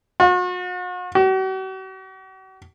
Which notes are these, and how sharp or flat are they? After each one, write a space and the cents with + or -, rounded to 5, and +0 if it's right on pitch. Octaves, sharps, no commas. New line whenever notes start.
F#4 -40
F#4 +45